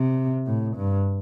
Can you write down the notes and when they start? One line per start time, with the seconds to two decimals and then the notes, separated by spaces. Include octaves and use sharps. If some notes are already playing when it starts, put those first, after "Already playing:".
Already playing: C3
0.46 A2
0.76 G2